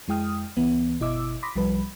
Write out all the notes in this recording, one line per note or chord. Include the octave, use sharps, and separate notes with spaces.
F2 G#3 E4 G5 D#6 F6
C#2 E3 B3
G1 B2 E4 D#5 D6 E6
B5 C6 D6 D#6 A#6 B6
C2 F3 G3 B4 B5